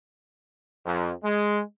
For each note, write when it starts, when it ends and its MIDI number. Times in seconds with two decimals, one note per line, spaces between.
0.86 1.12 41
1.24 1.61 56